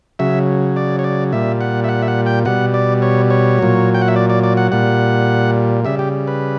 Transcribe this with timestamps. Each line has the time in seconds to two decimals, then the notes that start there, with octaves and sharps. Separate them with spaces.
0.19 C#3 F#3 E5
0.76 D5
0.99 C#5
1.04 D5
1.32 A#2 G3 E5
1.61 F#5
1.84 E5
1.89 F#5
2.02 E5
2.08 F#5
2.26 G5
2.45 B2 G3 F#5
2.74 D5
3.02 C#5
3.30 C#5
3.59 A#2 F#3
3.94 G5
4.02 F#5
4.08 E5
4.16 D5
4.30 D5
4.44 D5
4.57 F#5
4.72 A#2 G3 F#5
5.85 C#3 G3 E5
5.99 G4
6.27 B4